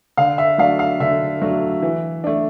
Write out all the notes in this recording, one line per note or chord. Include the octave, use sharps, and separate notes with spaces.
D3 F5
E5
F#3 A3 D4 F5
F5
D3 E5
F#3 A3 D4
E3
A3 D4